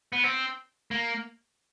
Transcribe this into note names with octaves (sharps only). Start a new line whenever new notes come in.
B3
C4
A#3